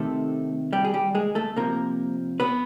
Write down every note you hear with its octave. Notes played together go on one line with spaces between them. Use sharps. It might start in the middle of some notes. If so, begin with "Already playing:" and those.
Already playing: C3 D#3 A3 A4
G3 G4
G#4
G3 G4
G#3 G#4
A3 A4
C3 F3 A#3 A#4
B3 B4